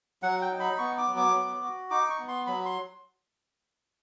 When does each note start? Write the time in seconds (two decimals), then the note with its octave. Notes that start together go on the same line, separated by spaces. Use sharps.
0.23 F#3 F#5
0.42 G5
0.51 D#4
0.60 B5
0.78 B3 C#6
0.98 D6
1.07 F#3
1.17 D6
1.34 B3
1.62 F#4
1.90 D#4 D6
2.10 C#6
2.19 B3
2.28 C6
2.47 F#3 B5
2.65 C6